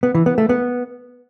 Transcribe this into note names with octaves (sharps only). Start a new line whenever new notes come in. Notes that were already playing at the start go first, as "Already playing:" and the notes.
B3
E3
B3
A3
B3